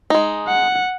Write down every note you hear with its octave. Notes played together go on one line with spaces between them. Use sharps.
G#3 D#4
F#5